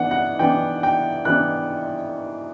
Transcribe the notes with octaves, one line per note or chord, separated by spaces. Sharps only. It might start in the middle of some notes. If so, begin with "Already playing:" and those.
Already playing: E3 B3 D4 F#5
F#5
E3 B3 D4 G5
G5
E3 B3 D4 F#6